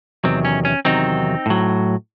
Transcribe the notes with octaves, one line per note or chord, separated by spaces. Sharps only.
E2 C3 D#3 F#3 C4
C#4
C#4
E2 C3 D#3 F#3 C4 D#4
A2 F#3